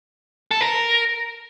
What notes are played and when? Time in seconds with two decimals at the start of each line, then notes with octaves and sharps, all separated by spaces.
0.51 A4
0.61 A#4